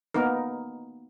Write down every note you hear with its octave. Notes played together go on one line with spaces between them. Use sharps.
A#3 B3 D#4 A#4